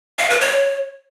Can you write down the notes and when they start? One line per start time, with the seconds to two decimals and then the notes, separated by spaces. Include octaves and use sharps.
0.19 F5
0.30 B4
0.41 C#5